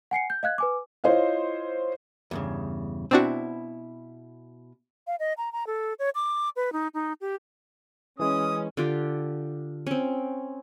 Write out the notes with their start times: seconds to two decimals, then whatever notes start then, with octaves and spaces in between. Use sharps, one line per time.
0.11 F#5 G#5 C7 C#7
0.30 G6
0.43 D#5 F5 F#6 G#6
0.58 B4 G#5 D6
1.04 E4 F4 C5 C#5 D#5 F5
2.31 E2 G2 C#3
3.11 B2 C4 D4 E4 F#4
5.07 F5
5.20 D#5
5.38 A#5
5.52 A#5
5.67 A4
5.99 C#5
6.15 D6
6.56 B4
6.73 D#4
6.94 D#4
7.21 G4
8.20 E3 G#3 C#4 D#6
8.77 D3 F4 G4
9.87 C4 C#4